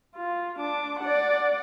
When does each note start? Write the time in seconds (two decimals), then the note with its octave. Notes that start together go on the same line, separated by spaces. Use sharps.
0.16 F4
0.59 D4 D6
1.00 D5 F#5